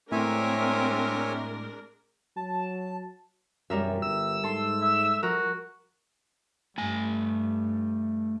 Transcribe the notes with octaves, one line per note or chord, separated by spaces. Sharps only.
A2 G#3 C4 D4 A#4 C#5 E5 G#5
F#3 A5
E1 F#2 G3 A#4 E5
G1 E6
G#2 A4 C6
E5
F3 F#4 A#4
G2 A3 G#5